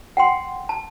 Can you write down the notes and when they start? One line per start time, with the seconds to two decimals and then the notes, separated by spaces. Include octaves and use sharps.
0.17 F#5 G5 C6
0.69 A5